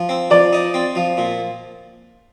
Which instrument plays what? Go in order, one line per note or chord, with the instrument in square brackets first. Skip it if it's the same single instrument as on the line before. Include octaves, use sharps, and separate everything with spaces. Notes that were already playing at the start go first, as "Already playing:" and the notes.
Already playing: [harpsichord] F3
C4
[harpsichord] F3 [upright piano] D5
[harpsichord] D#4
C4
F3
A#2